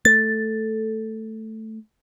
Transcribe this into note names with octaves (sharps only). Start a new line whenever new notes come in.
A3 A6